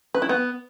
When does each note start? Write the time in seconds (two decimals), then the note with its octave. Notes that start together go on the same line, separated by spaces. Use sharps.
0.15 B4
0.22 E4
0.29 B3